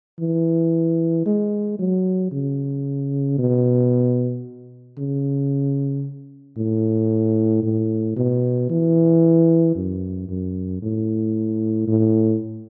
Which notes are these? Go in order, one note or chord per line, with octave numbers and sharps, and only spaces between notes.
E3
G#3
F#3
C#3
B2
C#3
A2
A2
B2
E3
F#2
F#2
A2
A2